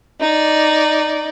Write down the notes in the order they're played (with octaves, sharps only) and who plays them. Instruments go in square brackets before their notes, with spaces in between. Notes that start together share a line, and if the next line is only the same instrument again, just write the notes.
[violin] D#4 D5